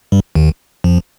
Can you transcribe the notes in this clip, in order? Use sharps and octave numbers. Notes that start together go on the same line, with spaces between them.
G2 G3
D#2 D#3
F2 F3